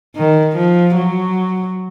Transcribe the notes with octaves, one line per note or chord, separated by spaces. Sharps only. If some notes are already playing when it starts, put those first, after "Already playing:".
D#3
F3
F#3